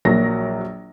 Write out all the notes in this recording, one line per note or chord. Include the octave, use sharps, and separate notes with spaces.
A#1 F#3 A#3 A#6